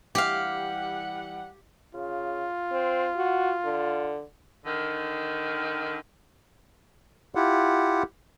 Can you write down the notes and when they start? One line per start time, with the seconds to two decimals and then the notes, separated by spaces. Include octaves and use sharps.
0.15 E3 G3 G4 F5 F#5
1.94 C#3 F4
2.72 C4
3.16 F#4
3.65 D3
4.65 D3 D#3
7.35 E4 F4 G4 F#5